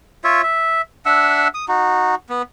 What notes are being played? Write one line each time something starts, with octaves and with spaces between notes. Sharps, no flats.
F4 C#5 E5
E5
D4 E5 F#5 E6
D#6
D#4 F#4
B3